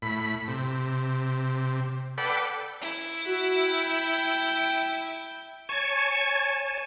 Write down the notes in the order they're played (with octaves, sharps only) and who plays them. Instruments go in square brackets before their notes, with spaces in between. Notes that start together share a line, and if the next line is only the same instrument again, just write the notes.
[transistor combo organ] A2 B5
C3
A4 B4 D5 F#5 G5
[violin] E4
[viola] F#4
G5
[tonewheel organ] C#5 G#5 A5 C#6